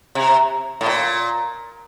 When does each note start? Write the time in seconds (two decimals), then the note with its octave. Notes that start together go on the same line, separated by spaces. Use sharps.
0.15 C3
0.81 A2
0.86 A#2